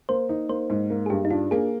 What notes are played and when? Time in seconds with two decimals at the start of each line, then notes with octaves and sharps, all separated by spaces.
0.09 A#3 C5
0.29 D#4
0.49 A#3 C5
0.70 G#2
0.90 A#3
1.06 G#4
1.10 G2 G4
1.25 D#4
1.30 D4 F4
1.51 A#3 G#4